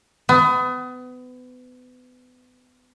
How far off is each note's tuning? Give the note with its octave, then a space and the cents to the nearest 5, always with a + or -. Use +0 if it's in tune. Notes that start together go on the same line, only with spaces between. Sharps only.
B3 +30